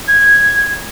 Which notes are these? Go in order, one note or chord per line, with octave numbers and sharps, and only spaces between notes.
G#6